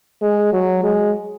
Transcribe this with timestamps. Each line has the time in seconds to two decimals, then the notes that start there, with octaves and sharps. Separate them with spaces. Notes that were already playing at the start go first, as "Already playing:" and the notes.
0.22 G#3
0.53 F#3
0.83 G#3